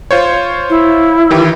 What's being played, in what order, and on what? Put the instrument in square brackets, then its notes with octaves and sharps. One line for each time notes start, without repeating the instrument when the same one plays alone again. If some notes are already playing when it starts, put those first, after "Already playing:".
[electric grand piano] F4 C5 C#5
[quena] E4
[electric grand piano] D#3 E3 G4